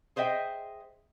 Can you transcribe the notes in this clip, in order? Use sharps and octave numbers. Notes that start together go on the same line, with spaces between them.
G#4 C5 D#5 E5 G5